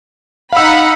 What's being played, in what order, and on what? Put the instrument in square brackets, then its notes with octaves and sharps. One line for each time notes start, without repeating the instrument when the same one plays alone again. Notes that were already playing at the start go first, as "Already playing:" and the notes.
[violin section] D#4 F#5 B5 [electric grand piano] F5 E6